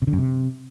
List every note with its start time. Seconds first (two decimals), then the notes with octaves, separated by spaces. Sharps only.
0.02 C3
0.07 D3
0.13 F#2
0.18 C3